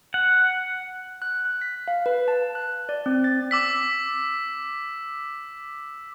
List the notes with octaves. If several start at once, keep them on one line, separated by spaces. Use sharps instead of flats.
F#5
F#6
F#6
B6
F5
B4
A5
F#6
D5
C4
A6
D6 E6 B6